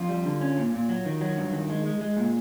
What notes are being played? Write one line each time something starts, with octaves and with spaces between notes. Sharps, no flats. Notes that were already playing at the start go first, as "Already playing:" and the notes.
Already playing: F2 F4
G3
D3
C#4
A#2
A#2
F#3
D#3
F#3
G2
D#3
G#3
G#3
G#3
A#2